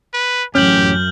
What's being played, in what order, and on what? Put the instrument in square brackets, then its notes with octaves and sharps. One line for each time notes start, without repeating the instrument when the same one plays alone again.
[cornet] B4
[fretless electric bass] A1 C#4 [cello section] F#2 [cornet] G4 [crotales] F6 G6 F#7